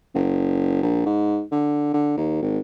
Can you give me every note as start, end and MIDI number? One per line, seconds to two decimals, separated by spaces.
0.14 0.82 30
0.83 1.02 34
1.06 1.42 44
1.51 1.93 50
1.93 2.14 50
2.17 2.38 39
2.42 2.59 32